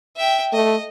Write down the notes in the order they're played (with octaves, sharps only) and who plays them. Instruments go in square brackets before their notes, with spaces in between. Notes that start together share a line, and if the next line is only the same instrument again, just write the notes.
[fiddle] E5 G5
[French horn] A3 [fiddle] D#5